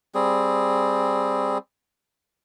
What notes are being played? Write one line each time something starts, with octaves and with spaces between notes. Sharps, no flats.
G3 C4 G#4